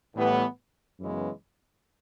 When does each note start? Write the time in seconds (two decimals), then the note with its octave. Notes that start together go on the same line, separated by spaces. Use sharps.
0.14 A2 E3 G3 B3
0.99 F#2 C#3 E3 G#3 B3